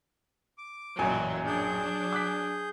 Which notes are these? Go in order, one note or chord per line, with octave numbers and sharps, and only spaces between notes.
D6
A1 F#2 A#2 E3 F#3 G#5
F#3 D4 G#4 G6
D6 F#6 B6